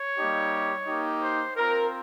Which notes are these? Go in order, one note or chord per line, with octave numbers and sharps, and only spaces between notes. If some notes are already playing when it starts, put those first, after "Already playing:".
Already playing: C#5
G3 A#3 D#4 G4
A#3 D#4 G4
C5
C4 F4 A#4